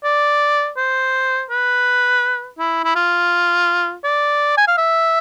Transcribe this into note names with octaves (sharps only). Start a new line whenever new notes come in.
D5
C5
B4
E4
E4
F4
D5
G#5
F5
E5